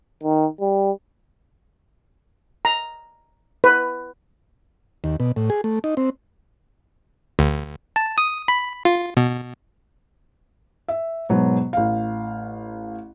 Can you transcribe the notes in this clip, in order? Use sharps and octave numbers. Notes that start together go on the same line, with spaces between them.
D#3
G3
A#5
B4
D#2
B2
A2
G#4
A3
D#4
C4
D2
A5
D#6
B5
F4
B2
E5
G#2 B2 F#3 B3
A1 F5